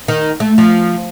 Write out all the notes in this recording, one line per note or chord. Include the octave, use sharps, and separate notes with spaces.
D#3
A3
F3